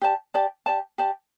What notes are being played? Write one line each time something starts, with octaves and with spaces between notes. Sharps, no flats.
G4 D5 A5
G4 D5 A5
G4 D5 A5
G4 D5 A5